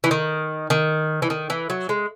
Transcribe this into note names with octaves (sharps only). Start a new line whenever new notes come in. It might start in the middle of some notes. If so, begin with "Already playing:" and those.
E3
D#3
D#3
E3
D#3
E3
F#3
G#3